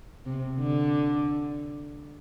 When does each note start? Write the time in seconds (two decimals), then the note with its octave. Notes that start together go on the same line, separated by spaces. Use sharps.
0.26 C3
0.58 D3